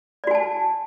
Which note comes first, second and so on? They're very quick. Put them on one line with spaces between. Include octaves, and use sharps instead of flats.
D5 F#4 G#5 A5